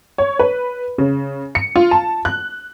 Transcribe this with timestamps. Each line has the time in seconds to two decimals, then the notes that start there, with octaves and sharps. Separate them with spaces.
0.18 C#5
0.39 B4
0.98 C#3
1.55 C#7
1.76 F4
1.91 A5
2.25 F#6